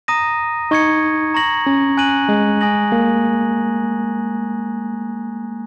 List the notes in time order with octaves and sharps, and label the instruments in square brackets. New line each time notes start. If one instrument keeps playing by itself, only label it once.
[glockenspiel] A#5 D#6 A#6 D#7
[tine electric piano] D#4 [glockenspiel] C#6 G#6 C#7
[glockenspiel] A#5 C#6 A#6 F#7
[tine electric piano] C#4
[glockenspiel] G#5 F#6 D#7 F#7
[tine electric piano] G#3
[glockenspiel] G#5 D#6 A#6 F#7
[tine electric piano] A#3